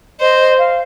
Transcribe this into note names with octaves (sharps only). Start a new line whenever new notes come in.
C5 D#5
F5